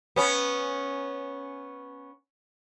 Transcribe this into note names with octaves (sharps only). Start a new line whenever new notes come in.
B3 C#4